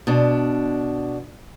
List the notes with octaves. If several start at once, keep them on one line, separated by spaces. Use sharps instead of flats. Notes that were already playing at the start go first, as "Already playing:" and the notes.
B2 D4